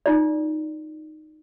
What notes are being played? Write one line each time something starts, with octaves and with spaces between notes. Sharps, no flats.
D#4 F4 D5